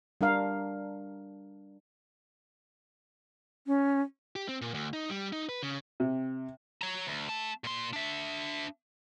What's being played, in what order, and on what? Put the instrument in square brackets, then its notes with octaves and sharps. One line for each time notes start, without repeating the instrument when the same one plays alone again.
[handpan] G3 D4 A#4 F5
[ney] C#4
[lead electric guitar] G4
C4
A#2
D2
D#4
G3
D#4
B4
C#3
[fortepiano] C3
[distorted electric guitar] C#5 A#5
D2
A3 A5
A#2 C6
D4 E5